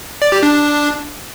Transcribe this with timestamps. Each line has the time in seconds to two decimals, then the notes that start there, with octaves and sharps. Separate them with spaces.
0.22 D5
0.32 G4
0.43 D4